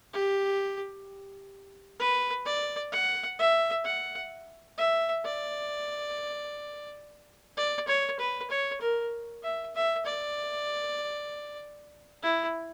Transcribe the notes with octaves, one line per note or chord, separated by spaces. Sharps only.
G4
B4
D5
F#5
E5
F#5
E5
D5
D5
C#5
B4
C#5
A#4
E5
E5
D5
E4